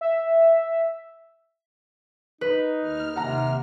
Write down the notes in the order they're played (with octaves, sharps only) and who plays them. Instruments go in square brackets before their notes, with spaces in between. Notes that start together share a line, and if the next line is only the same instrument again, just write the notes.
[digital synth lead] E5
[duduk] D#4 [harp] B4
[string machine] D#2 F6
[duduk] C3 [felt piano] F#5 A#5